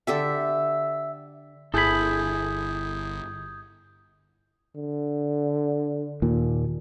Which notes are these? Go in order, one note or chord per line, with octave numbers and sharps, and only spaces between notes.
D3 G4 A4 E5
G1 E4 G#4 A4 B5 D#6 G6 G#6
D3
D#2 A#2